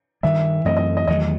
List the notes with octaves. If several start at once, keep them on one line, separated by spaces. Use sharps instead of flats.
G2 D#3 G3 E5
F#2 E3 A3 C4 D#5
D#5
D#5
E2 D#3 F#3 A3 D#5